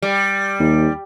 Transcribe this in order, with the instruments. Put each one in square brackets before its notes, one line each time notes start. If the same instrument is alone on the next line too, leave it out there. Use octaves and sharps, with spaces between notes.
[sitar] G3
[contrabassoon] D#2